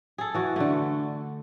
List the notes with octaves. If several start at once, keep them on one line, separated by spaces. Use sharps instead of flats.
G#4 A4
E3 F#4
D3 A3